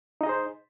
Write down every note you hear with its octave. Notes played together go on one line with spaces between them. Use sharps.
D#4 G#4 C5 D#5